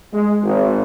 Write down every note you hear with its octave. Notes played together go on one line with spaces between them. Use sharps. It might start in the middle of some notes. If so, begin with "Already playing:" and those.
G#3
G#1